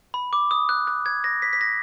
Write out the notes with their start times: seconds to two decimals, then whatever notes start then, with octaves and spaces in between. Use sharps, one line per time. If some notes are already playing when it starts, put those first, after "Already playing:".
0.14 B5
0.33 D6
0.51 D#6
0.69 F#6
0.87 F#6
1.06 G#6
1.24 A#6
1.42 B6
1.53 B6
1.61 A#6